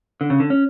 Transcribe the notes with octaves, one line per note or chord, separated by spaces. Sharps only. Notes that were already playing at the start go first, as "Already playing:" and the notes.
D3
C#3
D3
C#4